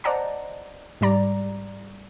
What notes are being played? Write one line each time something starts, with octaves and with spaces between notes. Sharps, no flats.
C5 D5 D#5 F#5 A5 A#5
G#2 G3 D5 A#5